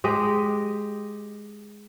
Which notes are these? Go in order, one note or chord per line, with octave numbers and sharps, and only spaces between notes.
G#3 G4 D#5